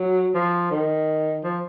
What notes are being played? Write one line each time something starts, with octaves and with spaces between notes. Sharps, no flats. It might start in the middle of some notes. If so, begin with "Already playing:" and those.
Already playing: F#3
F3
D#3
F3